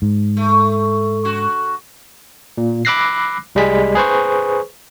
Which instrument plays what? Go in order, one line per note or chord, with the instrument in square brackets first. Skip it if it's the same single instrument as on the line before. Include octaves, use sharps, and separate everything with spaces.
[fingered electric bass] G#2
[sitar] A3
C#3 F#4
[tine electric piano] A#2
B5 D6 E6 F#6 A#6 C7
C2 G3 G#3 G#4 B6
G#4 B4 C5 C#6